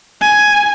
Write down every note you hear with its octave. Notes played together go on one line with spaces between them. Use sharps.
G#5